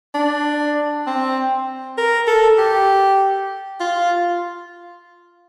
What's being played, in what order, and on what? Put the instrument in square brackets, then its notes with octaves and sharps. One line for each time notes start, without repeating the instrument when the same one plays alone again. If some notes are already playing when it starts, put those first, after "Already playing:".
[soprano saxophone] D4
C4
A#4
A4
G4
F4